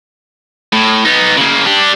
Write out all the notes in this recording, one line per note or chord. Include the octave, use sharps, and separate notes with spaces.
A2
B3 D#4
C#3 A#3
D4 G4